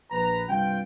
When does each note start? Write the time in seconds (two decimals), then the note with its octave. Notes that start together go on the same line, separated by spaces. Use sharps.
0.11 A#1 B4 A#5
0.48 G2 C3 G3 F4 G5